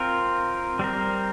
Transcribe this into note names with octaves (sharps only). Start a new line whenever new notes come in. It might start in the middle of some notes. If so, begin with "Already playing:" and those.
Already playing: C4 F4 A#4
G3 C4 A#4